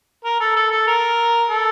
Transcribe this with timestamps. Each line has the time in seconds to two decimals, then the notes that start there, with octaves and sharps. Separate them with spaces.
0.24 A#4
0.40 A4
0.56 A4
0.72 A4
0.87 A#4
1.50 A4